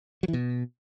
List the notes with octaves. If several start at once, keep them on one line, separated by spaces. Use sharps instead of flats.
F#3
E3
B2